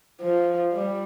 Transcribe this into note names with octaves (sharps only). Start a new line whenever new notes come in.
F3
G3